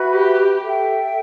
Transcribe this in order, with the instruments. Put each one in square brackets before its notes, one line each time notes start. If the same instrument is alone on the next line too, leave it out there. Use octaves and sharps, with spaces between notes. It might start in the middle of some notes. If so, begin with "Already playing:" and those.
Already playing: [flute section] F#4 B4 E5 B5
[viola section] G4
[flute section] A4 E5 G5